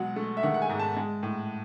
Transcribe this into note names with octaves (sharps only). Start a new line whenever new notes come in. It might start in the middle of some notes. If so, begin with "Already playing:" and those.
Already playing: B2 F#3 G#3 F#5
A3
E5
D#3 F#5
F#5
G#5
G#2
A5
G#3
A2